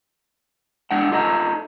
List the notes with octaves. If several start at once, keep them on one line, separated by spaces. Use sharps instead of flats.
G#3 D4 F#5 G5
D#4 F4 A4 D#5 A#5